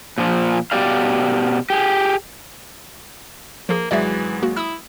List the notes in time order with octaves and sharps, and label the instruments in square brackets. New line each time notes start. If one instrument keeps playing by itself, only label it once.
[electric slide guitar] A#2 F3
B2 G4 D5 F5
G4 G#4
[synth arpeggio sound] F3 G#4 [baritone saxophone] A#3
[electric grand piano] G#1 F#3 G#3 [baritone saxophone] E3 [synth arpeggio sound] D5 E5
[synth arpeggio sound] A#3 F#4
[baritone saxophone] E4 [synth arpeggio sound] D#6 E6